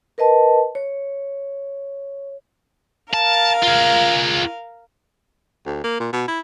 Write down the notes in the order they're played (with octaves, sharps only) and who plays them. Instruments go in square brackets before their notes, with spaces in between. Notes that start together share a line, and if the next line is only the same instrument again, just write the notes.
[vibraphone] A#4 B4 D#5 A5
C#5
[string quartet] A#4 F5 [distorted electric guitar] A5
[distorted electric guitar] F4 G#4
[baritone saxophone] D2
A#3
A#2
B2
E4